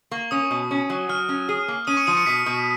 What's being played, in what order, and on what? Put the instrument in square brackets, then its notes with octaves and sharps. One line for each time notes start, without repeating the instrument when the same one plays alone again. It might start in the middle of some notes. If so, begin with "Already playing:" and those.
[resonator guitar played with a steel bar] A#3 [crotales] C#6
[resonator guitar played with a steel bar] C#4 [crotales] D#6
[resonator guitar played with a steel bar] B2
C#4
F#3
[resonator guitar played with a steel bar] F#3 [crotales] F6
[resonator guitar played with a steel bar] C#4
G#4
A#3
[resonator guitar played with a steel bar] C#4 [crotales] D#6 D#7
[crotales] C#6 C#7
[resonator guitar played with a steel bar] F3 [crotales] D#6 D#7
[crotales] C#6 C#7
[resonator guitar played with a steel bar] B2 [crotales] B6
[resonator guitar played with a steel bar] B2